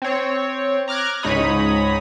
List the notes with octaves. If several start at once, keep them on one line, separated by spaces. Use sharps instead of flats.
C4 C#5
A#5 D6 F6 F#6 G#6
C#2 G#2 D#4 C#5 B5 D#6